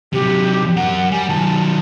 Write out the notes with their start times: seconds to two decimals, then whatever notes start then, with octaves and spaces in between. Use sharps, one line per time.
0.13 C3 F#3 G4
0.76 F#2 A#4 F#5
1.12 G3 G#5
1.29 D#3 F#3 A5